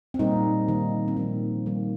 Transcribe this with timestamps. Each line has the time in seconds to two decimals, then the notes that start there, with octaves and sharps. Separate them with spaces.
0.14 C4
0.19 A#2 G3 A#3 D#4
0.68 D#3 A#3
1.08 C4
1.17 A#2 F3 A#3 D#4
1.66 D#3 G3 A#3